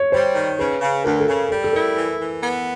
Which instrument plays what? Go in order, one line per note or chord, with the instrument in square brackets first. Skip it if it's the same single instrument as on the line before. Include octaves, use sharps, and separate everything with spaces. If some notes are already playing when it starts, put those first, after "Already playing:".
Already playing: [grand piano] C#5
[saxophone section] G3 [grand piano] C5
[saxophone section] D#3
[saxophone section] C#3 [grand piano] B4
[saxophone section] C#3
[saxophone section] D2 [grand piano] A#4
[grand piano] A4
[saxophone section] C#3
[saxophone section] G3 [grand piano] A4
[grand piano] A4
[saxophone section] E4 [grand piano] A#4
[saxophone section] E3
E3
B3